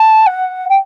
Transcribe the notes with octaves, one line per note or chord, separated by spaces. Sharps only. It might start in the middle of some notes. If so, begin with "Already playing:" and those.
Already playing: A5
F#5
G5